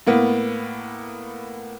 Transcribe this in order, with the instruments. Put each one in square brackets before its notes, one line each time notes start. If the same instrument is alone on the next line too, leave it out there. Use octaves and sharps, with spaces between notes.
[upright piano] A2 A#3 B3